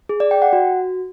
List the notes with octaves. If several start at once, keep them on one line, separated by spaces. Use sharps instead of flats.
G#4
D5
G5
F#5
F#4